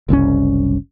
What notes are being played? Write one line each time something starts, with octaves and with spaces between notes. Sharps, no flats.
F#1 C2 C#3 C#4